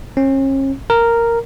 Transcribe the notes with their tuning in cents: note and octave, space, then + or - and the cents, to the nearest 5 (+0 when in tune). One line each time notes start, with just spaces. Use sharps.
C#4 -40
A#4 -5